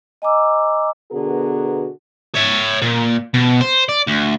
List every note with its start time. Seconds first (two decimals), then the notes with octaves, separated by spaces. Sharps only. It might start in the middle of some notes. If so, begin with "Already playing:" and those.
0.22 D#5 G#5 A#5 D6 E6
1.11 B2 D3 B3 F#4 G#4 A#4
2.35 C#5 E5
2.82 A#2
3.34 B2
3.61 C5
3.89 D5
4.07 D2